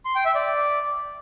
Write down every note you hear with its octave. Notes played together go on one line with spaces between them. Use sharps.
C6
G5
E5
D5